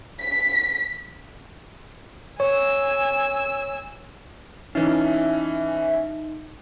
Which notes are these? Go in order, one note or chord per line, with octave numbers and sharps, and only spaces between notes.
B6
C#5 G#5 E6
E3 C#4 D#4 E5